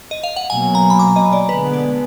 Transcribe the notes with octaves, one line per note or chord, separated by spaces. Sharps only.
D#5
F5
F#5
B2 F#3 A#3 G#5
A#5
B5
D6
D#5
D5
D3 G#3 B3 B4
D5